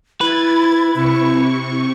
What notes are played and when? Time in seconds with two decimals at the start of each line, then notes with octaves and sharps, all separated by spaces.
0.21 E4 B4 G#6 A6
0.94 C3 E4 C#6